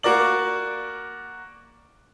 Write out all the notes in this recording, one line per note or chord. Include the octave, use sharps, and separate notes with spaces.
A#3 F#4 A#4 D5 F#7